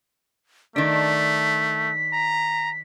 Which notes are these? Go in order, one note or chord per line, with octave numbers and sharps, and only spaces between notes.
D#3 A3 D4 B6
A#5